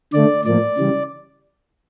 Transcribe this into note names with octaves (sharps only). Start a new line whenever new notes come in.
D3 A3 D5
A2 F3 A#3 D5
C#3 E3 G3